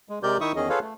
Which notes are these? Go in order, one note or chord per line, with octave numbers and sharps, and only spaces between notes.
G#3
C3 G#3 G4 A#4 D5 G6
D#3 D#4 E4 E5 C#6 D#6
E2 D#3 C#4 G#4 D#5
F4 G#4 A4 B4 C#5 F5
A3